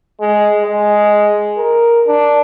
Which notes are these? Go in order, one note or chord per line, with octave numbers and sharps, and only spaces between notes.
G#3
G#3
A#4
D4